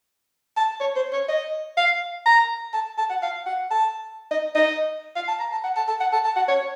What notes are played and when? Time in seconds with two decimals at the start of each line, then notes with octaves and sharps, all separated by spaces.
0.57 A5
0.80 C#5
0.96 C5
1.13 C#5
1.28 D#5
1.77 F5
2.26 A#5
2.74 A5
2.98 A5
3.10 F#5
3.23 F5
3.46 F#5
3.71 A5
4.31 D#5
4.55 D#5
5.16 F5
5.28 A5
5.40 A#5
5.52 A5
5.64 F#5
5.76 A5
5.88 A5
6.01 F#5
6.13 A5
6.25 A5
6.36 F#5
6.48 C#5